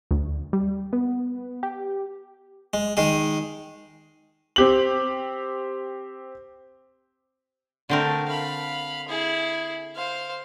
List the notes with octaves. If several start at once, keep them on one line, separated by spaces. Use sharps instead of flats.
D2
G3
B3
G4
G#3
D#3 G#3 G#4
C4 G4 F#7
D3 A3 C4 A#4
F5 B5
E4 G#4
C5 F5